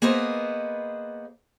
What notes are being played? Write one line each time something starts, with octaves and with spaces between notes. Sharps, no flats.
A#3 B3 G#4 B4 C5 D#5